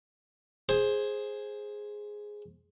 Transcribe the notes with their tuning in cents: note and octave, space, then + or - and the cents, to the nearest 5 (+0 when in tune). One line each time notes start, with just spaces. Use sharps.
G#4 +0 C5 +15